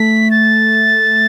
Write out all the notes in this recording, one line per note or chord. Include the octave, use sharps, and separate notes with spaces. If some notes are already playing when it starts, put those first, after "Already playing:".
Already playing: A3 B6
A6